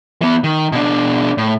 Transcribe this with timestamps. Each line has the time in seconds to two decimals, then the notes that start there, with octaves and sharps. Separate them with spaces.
0.22 E3 B3
0.44 D#3
0.72 B2 D4
1.38 A2